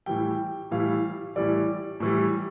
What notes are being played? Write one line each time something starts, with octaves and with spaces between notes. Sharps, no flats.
A2 E3 G3 G5
A2 E3 G3 F5
A2 E3 G3 D5
A2 E3 G3